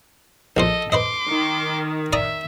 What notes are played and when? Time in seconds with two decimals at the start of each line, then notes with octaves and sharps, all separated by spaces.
0.57 A#1 A#2 A4 C5 D#5
0.92 B4 C5 D#5 C6 D6
1.29 D#3
2.13 D5 E5 A#5 D#6